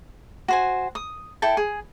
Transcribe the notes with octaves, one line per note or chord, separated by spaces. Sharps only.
F#4 C5 G#5
D#6
E4 A4 G5 A5
G#4